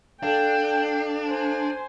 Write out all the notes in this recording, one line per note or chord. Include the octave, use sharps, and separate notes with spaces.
D4 A4 F5 G5
C5 G#5